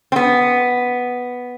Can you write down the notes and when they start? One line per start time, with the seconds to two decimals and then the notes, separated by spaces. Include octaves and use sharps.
0.12 C4
0.16 B3